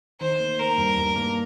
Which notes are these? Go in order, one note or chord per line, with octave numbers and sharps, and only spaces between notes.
D#3 C5
A#3
A#3 A#4
G2
G2
A#3